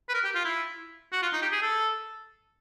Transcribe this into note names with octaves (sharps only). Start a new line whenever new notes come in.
B4
A#4
G4
F4
E4
F#4
F4
D#4
G4
G#4
A4